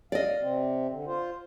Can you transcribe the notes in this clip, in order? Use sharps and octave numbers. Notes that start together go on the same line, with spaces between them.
D5 D#5 F5
C3 C4
D3
F4 C5